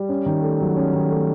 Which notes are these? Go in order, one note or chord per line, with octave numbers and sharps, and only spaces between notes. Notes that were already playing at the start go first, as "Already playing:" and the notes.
Already playing: G3
C#4
D#3
A3
F#3
C#4
D#3
A3